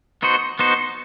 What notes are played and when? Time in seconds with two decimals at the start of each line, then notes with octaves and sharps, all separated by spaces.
0.22 B3 D#4 F#4 C5
0.59 B3 D#4 F#4 C5